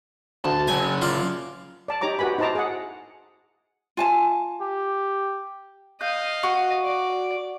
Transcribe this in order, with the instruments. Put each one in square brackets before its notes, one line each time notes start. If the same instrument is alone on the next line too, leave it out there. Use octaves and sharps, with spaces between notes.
[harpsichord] D2 [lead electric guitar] A5
[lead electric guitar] C#3 F#3 [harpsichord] G#5
[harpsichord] F4 D5
[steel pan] D5 A5
D#4 G4 C#5 A#5 D6
F#4 G4 B4 G#5 B5
D#4 E4 C5 A5 A#5 D6
G#4 F#5
[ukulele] F4 G#5 A5
[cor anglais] G4
[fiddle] D#5 F5 [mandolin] G6
[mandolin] F#4
[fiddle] D5